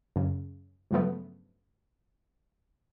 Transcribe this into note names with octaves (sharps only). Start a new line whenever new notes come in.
F#2 C#3
G2 C#3 F3 F#3 A3 B3